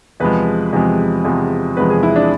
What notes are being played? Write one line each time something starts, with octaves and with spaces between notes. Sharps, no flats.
E2 C3 F3 G#3 B4
E2 C3 F3 G#3
E2 C3 F3 G#3
E2 C3 F3 G#3 B4
G#4
E4
D4